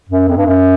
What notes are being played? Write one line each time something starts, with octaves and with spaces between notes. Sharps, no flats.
F#2
F2
G2
F#2